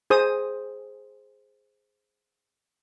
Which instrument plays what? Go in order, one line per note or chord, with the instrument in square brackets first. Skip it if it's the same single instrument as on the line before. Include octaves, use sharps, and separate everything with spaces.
[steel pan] G#4 C5 D#6